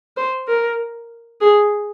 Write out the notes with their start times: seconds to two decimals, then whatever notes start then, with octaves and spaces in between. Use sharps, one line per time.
0.17 C5
0.48 A#4
1.41 G#4